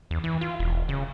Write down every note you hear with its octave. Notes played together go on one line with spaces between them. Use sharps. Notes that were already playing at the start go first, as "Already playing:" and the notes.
E2
E3
F4
E1
C#3